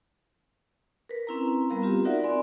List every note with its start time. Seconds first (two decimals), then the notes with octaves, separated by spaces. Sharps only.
1.09 A#4 B4
1.27 C4 C#4 E4 B4 A#5
1.70 G3 B3 A#4 F5 A#5
1.82 C4 F4 G4
2.05 D#4 F#4 A#4 D5 E5 F#5
2.24 C4 D5 G#5 B5 C6